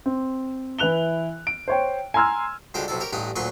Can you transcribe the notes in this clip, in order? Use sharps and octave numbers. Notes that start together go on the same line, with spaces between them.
C4
E3 E4 B4 F#6 F7 G7
D7
C5 C#5 G5
G#5 A#5 C6 E6 F6 G#6
C#2 D3 G3 F#4 G4 C5
B1 C3 E4 A4
G4 A#4 C#5
A1 G2 D#4 G4 F#5
D2 A#2 F#3 B4 C6 C#6